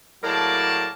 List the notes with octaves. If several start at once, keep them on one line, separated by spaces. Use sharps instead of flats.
A2 F#3 A#3 G#4 D5 A5